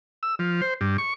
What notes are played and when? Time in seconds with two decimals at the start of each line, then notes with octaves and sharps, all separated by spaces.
0.23 E6
0.39 F3
0.62 C5
0.81 G2
0.98 C#6